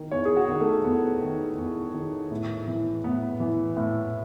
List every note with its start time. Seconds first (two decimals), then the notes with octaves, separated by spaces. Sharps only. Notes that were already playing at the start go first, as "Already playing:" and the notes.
Already playing: D#3
0.11 E2 C#5
0.25 G#4
0.37 F#4
0.48 D#3
0.61 A3
0.85 E2 B3
1.21 D#3
1.58 E2
1.94 D#3
2.31 A2
2.67 E3
3.04 A2 B3
3.40 E3
3.77 A2